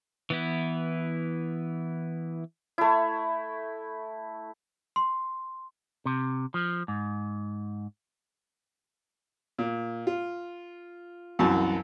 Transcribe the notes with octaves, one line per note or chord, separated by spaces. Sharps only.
E3 B3 E4
A3 E4
C6
C3
F3
G#2
A#2
F4
C2 F#2 E3 F#4 G#5 A5